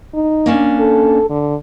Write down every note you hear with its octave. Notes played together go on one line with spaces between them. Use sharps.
D#4
A#3 C#4 D4
A4
D3